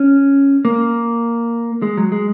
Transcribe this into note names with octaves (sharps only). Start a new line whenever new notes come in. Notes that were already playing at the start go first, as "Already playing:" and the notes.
Already playing: C#4
A#3
G#3
F#3
G#3